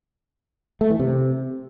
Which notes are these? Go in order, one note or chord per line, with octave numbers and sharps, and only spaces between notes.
A3
E3
C3